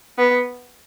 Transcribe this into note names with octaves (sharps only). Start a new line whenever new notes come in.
B3